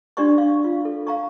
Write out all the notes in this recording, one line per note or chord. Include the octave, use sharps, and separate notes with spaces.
D4 G4 D5 C6 C#6
F5 C#6
F4
A4
F5 A#5 C#6